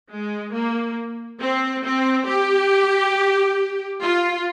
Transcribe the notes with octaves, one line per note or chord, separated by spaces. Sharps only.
G#3
A#3
C4
C4
G4
F4